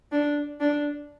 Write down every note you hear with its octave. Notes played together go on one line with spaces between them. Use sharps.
D4
D4